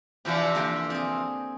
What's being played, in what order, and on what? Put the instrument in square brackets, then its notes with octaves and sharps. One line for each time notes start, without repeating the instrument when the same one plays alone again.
[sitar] C3 E3 F3 [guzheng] D4 F#4 G4
[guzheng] D3 A#3 G4
C4 G#4